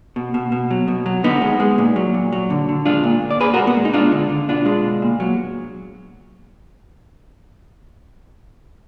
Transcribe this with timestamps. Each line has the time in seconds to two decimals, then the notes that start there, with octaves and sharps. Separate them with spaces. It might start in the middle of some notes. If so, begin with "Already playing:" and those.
0.16 B2
0.34 B2
0.52 B2
0.71 F#3
0.88 B2
1.06 F#3
1.24 D3 B3 D#4
1.42 G#3
1.60 G#3
1.78 A#2
1.96 F#3
2.14 A#2
2.32 F#3
2.50 D3
2.69 D3
2.86 G#3 D4 F4
3.04 A#2
3.22 A#2
3.31 D5
3.40 A#2 G#4 B4
3.54 F#4 A#4
3.58 G#3
3.67 B3
3.77 G#3
3.85 D#4
3.94 G#3 D4 F4
4.12 D3
4.30 D3
4.48 B2 D4 F4
4.66 G#3
4.84 B2
5.02 A#2
5.20 F#3